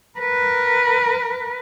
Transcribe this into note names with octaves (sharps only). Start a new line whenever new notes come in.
A#4 B4